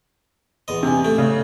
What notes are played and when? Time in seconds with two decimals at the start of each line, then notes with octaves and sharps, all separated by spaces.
0.68 E2 D#5
0.83 C3 G#5
1.05 A3
1.18 C#3